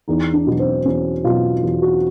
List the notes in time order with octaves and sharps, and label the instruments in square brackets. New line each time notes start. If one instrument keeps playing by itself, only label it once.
[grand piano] E2 D#4
D4
B2 F#3
C4
E2 C#4
B2 F#3 F4
E2
F#4